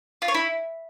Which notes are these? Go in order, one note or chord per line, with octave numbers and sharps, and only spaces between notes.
F4
C#5
E4